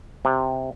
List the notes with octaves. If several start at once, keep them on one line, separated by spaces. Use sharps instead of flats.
C3